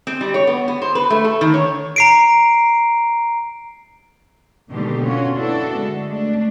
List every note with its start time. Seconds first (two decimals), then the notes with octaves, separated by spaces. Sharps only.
0.07 C4
0.21 G3
0.34 C#5
0.47 B3
0.68 B3
0.82 C5
0.95 B4
1.10 A3
1.25 A4
1.41 D#3
1.54 C#5
1.96 A#5 C7 D7
4.71 B2 D3 D#3 G#3 A#3 G4
5.05 C#4 F4 F#4 C#5
5.36 B3 D4 E4 F#4 A4
5.77 D3 G#3 A3
6.10 A3 D4